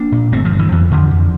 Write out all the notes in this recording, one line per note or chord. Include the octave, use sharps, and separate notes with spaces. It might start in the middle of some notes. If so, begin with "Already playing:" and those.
Already playing: A#3 D4
A#2
G1 A3 C4
F3 A3
G2
E3
F2 E3
F2 D3 F3
D3